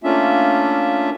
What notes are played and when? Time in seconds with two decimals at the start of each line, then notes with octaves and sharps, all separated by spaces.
0.04 A3 A#3 C#4 D4 F4 E5